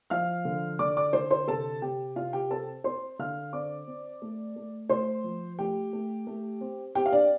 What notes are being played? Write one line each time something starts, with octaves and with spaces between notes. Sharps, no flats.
F3 F5 F6
D3
D3 D5 D6
D5 D6
D3 C5 C6
C5 C6
C3 A4 A5
C3 G4 G5
C3 F4 F5
G4 G5
C4 A4 A5
C4 C5 C6
D3 F5 F6
C4 D5 D6
C4
A3
A3
A3 C5 C6
F3
A3 G4 G5
A3
A3
C4
C4 G4 G5
F5
D4 D5